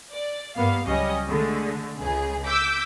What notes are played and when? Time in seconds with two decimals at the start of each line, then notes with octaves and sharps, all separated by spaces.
0.11 D5
0.56 G2 A#3 B3 F5
0.86 C#2 F#3 G3 C#4 D#5
1.27 D3 G#3 A3
2.00 C#2 G#4
2.47 D6 E6 G6 B6